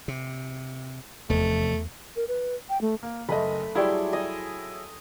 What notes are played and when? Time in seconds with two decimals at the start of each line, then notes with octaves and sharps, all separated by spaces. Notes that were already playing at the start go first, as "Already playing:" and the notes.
0.08 C3
1.30 F1 E2 A3
2.16 A#4
2.28 B4
2.69 G5
2.81 A3
3.03 A#3
3.29 F#1 A3 B4 D#5 B5
3.75 F#3 G3 E4 G#4 C6 C#6
4.12 D#5 G#5